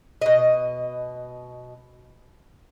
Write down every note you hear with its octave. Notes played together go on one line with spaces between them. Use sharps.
B2 D#5